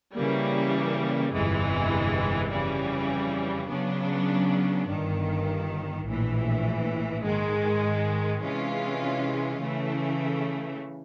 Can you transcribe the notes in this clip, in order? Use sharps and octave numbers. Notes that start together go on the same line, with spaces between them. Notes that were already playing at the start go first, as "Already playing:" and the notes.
C#3 E3 G3 A#3
G1 F2 C3 E3 G#3
F2 C#3 E3 G3
C#3 F#3 B3 D4
G1 G2 D#3
A#1 A2 E3
G#2 D#3 G#3
C3 E3 G#3 C#4 F4
C#3 E3 A3